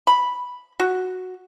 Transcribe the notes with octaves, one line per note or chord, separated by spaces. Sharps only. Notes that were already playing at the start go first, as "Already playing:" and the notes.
B5
F#4